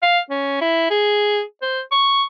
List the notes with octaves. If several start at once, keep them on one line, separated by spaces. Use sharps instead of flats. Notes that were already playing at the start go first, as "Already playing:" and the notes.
F5
C#4
E4
G#4
C5
C#6